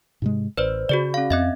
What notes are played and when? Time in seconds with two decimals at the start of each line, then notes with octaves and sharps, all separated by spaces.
0.22 G#2 C3 G#3
0.57 A1 B4 C5 D5
0.89 C#3 F#4 G#4 D5
1.14 C#4 F5
1.30 F2 C4 D#5 E5